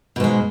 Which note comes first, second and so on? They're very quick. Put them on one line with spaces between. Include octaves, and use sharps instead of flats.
B2 G#2 G#3